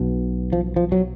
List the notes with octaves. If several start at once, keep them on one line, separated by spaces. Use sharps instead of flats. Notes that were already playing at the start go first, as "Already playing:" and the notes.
Already playing: B1 B2
F3
F3
F#3